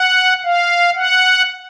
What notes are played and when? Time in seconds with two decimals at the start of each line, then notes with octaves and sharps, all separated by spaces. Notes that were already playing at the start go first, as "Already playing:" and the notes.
Already playing: F#5
0.44 F5
0.95 F#5